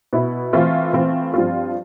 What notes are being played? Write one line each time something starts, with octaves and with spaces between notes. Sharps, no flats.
B2 B3 E4
E3 A3 C4 F4
E3 A3 C4 F4
G2 F3 C4 F4